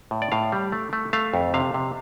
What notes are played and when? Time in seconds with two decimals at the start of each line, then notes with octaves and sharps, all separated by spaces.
0.11 A2
0.22 D5
0.32 A2 F5
0.52 G3
0.72 A3
0.93 A3
1.13 A3 F5
1.34 F2
1.54 C3 F5
1.74 C3